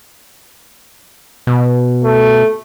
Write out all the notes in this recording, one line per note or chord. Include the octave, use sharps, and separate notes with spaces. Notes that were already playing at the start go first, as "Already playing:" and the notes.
B2
A3